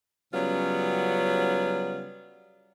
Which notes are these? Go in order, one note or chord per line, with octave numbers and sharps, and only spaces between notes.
C#3 F#3 G3 B3 C#4 F4